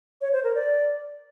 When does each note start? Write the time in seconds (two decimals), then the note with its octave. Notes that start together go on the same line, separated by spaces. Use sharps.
0.21 C#5
0.33 C5
0.44 A#4
0.55 D5